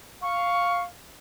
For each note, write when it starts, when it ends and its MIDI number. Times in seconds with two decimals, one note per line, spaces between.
0.22 0.86 77
0.22 0.82 85